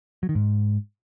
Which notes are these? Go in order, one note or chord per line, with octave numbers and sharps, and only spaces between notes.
F#3
D#3
G#2